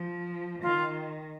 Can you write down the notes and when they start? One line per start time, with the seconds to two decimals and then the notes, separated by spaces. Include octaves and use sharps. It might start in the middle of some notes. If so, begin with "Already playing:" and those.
Already playing: F3
0.62 D#3 F4